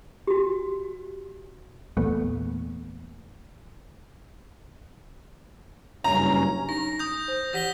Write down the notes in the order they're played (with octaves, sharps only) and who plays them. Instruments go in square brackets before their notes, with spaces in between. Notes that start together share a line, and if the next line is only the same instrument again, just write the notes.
[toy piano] F#4 G4
[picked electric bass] E2 A#2 A3 B3
[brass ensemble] F#1 G2 C#4 [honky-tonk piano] A#5
[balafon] D#4 [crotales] A#6
[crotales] D#6 G6
[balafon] C5
[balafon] E3 G4 F#5 [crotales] A#6 B6 G7